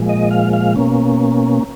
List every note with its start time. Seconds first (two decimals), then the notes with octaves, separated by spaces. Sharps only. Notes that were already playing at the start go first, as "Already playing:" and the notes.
Already playing: A#2 F3 G#3
0.09 D#5
0.31 F5
0.53 F5
0.76 B2 A#3 C#4